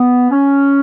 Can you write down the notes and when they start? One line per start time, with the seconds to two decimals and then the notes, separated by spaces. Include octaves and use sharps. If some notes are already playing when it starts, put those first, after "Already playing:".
Already playing: B3
0.31 C#4